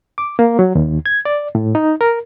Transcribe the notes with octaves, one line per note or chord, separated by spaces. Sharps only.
D6
A#3
F#3
D#2
G#6
D5
A2
D#4
A#4